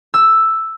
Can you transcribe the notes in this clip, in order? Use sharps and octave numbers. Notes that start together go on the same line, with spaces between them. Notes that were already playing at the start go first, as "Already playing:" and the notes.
E6